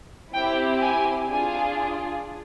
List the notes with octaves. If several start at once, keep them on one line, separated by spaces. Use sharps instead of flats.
C4 E4 G4 G5
G#5
D4 F4 G#4 G#5